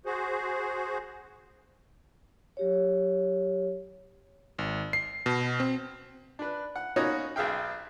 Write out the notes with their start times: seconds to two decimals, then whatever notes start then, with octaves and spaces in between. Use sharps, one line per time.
0.05 F#4 G#4 C5
2.57 F#3 G4 C#5
4.59 G#1
4.93 C7
5.26 B2
5.60 C4
6.39 D4 B4
6.76 F#5
6.96 A#3 B3 C#4 D#4 F#4 D#5
7.36 B1 G#4 E5 F5 G5